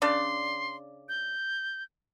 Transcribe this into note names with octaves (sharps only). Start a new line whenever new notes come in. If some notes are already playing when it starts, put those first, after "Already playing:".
C#3 D4 D5 C6
G6